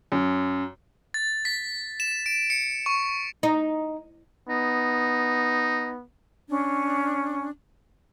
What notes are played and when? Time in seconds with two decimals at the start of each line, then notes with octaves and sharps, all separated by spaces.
0.12 F#2
1.14 A6
1.45 B6
2.00 E7
2.26 D7
2.50 C#7
2.86 C#6
3.43 D#4
4.49 B3 D#4
6.49 C#4 D4